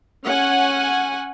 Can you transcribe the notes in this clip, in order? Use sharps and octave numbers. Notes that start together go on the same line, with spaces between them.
C#4 F#5 G#5